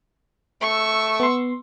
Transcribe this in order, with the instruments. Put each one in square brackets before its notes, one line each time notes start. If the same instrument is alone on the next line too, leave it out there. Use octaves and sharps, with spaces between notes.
[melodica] A3 [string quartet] C#6 E6
[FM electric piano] B3 C6